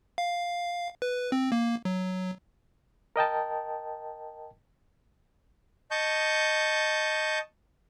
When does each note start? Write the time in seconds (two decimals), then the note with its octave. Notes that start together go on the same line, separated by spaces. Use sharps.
0.18 F5
1.02 B4
1.32 C4
1.52 A#3
1.85 F#3
3.16 A#4 D#5 G5 A5
5.91 D#5 A5 C#6 G6